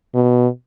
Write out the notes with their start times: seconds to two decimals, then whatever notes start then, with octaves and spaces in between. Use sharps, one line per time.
0.14 B2